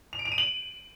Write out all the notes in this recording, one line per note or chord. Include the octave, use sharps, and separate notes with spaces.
F7
D7
F7
D#7
F#7